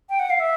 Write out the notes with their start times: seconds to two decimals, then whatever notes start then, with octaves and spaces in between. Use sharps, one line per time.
0.10 G5
0.19 F#5
0.30 F5
0.40 E5